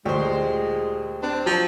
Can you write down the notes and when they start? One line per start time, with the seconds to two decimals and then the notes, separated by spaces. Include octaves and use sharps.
0.05 D2 A#2 G#3 G4 C5
1.23 C4 D4
1.46 F3 F#3